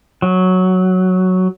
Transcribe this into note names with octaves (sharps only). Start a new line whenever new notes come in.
F#3